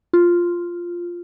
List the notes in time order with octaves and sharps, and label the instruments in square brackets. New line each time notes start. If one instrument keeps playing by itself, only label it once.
[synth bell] F4